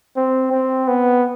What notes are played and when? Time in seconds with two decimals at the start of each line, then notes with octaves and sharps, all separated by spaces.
0.16 C4
0.52 C4
0.88 B3